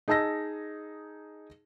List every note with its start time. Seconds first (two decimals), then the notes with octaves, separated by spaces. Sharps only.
0.08 D#4 G#4 A5 E6 A#6